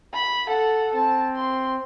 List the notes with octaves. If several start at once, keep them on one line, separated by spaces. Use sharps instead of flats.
B5
A4 F#5
C4 A5
C6